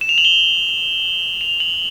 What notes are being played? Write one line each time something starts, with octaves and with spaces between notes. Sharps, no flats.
E7
F7
F#7
G7
F7
F#7